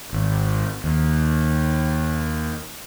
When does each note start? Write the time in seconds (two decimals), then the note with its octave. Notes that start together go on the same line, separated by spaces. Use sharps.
0.13 G#1
0.84 D#2